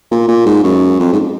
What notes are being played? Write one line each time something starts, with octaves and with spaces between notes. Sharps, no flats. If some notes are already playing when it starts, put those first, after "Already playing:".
A#2
A#2
G#2
F#2
F2
G#2